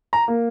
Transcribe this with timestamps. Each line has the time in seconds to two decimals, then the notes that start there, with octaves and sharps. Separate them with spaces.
0.13 A#5
0.28 A#3